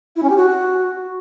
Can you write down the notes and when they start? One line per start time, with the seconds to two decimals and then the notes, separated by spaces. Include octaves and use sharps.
0.16 E4
0.22 C#4
0.29 G4
0.36 F#4